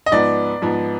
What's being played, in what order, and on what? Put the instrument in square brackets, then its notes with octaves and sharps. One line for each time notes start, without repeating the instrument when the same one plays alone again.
[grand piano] D#5
[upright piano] G#2 F3 B3 [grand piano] D5
[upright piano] G#2 F3 B3